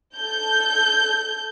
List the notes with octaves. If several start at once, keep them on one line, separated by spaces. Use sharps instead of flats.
A4 G6